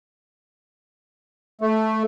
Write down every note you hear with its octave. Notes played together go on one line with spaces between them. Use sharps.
A3